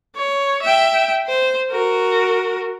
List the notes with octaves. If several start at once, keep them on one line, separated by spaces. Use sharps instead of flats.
C#5
E5 G5
C5
F#4 A#4